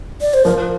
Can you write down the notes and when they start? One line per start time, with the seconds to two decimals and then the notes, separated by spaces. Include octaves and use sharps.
0.21 D5
0.34 C5
0.45 F3 A#4